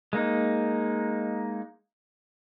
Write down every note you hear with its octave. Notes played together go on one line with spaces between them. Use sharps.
G#3 A#3 D#4